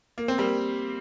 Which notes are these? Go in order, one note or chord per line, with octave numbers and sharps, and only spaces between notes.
A#3
C4
G3 A#3